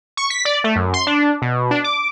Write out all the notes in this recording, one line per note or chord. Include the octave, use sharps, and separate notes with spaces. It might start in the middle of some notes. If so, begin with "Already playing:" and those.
C#6
B6
D5
A3
F#2
C6
D4
B2
D4
D6